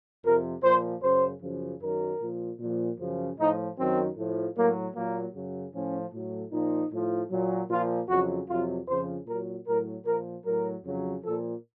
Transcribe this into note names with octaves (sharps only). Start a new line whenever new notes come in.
F2 C3 F3 A#4
A#2 F3 C5
F#2 C#3 F#3 C5
F#2 C#3 F3
F#2 D#3 F#3 A#4
A#2 F3
A#2 F3
F#2 C#3 F3
A2 F3 D#4
F#2 D#3 F#3 C4
A2 F3
A2 F#3 A#3
A#2 F#3 A#3
F#2 C#3 F#3
A2 F3 C#4
A2 F#3
A#2 F3 D#4
A2 F3
A#2 F#3
A#2 F3 F4
F2 C#3 F#3 F#4
F2 C3 F#3 F4
F2 C#3 F3 C5
A#2 F#3 A#4
A2 F#3 A#4
A#2 F3 A#4
A2 F#3 A#4
F2 C#3 F#3
A#2 F3 A4